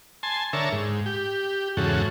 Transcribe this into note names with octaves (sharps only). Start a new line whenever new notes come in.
G#5 A5 C6
D3 A#4 C#5 E5 A5
G#2
G4
E2 G#2 C#3 F#4 A4